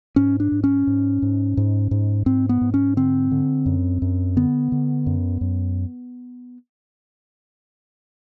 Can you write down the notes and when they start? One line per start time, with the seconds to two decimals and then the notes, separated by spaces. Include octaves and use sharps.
0.16 G#2 C#4
0.40 D4
0.52 G#2
0.64 C#4
0.87 G#2
1.22 G#2
1.57 G#2
1.91 G#2
2.26 G#2 C4
2.49 B3
2.61 G#2
2.74 C#4
2.97 D3 C4
3.32 D3
3.66 F#2
4.02 F#2
4.36 D3 B3
4.72 D3
5.06 F#2
5.41 F#2